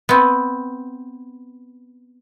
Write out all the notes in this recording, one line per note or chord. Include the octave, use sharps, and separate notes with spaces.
B3 C4